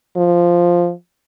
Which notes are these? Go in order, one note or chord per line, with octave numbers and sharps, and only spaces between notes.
F3